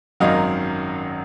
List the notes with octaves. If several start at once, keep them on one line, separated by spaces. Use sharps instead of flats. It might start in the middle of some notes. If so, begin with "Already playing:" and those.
G#1 F#2 D#3 F#3 D#5 F5